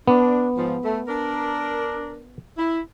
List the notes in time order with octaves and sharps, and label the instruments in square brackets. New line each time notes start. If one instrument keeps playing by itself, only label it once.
[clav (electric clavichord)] B3 [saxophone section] D4
[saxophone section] G#2 F3
A3
D4 A#4
E4